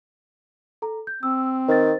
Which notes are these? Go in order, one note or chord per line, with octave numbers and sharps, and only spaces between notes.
A4 A#5
G6
C4 E6
D#3 C5 A6